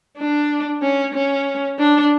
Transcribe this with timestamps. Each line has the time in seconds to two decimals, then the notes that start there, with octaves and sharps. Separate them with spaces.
0.18 D4
0.82 C#4
1.14 C#4
1.79 D4